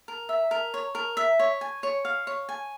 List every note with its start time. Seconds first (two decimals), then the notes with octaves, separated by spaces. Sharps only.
0.08 A#4
0.29 E5
0.51 A#4
0.74 C#5
0.95 A#4
1.17 E5
1.39 C#5
1.61 G#5
1.83 C#5
2.05 F5
2.27 C#5
2.49 G#5